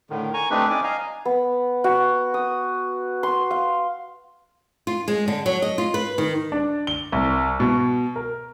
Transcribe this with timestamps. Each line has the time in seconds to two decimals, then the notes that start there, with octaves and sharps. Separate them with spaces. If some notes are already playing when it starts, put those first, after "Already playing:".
0.10 A2 D3 D#3
0.34 G#5 A#5 C#6
0.50 A3 C4 D4 D#4 G4 B4
0.70 C4 C#4 D#4 D5 G#5 D6
0.84 D#5 F5 G#5 A#5
1.25 B3
1.84 F#4
2.34 D#6
3.23 C6
3.51 F5
4.87 F4
5.08 G#3
5.28 D3
5.46 F#3
5.62 D#5
5.78 F4
5.94 B4
6.18 D#3
6.52 D4
6.87 G7
7.12 C2
7.60 B2
8.16 A#4